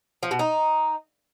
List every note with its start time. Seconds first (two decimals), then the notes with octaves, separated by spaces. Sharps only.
0.23 F3
0.31 B2
0.39 D#4